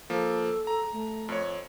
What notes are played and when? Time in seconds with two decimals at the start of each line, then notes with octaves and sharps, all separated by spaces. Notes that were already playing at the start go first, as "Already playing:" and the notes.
0.10 F3 A#3 A4
0.67 A#5
0.92 A3
1.29 F2 C#5